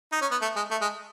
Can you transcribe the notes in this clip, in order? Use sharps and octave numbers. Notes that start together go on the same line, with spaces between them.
D#4
C#4
B3
A3
G#3
A3
G#3